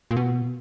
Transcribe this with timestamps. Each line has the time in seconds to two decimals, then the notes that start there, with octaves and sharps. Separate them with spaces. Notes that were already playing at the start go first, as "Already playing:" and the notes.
0.11 A#2
0.17 B2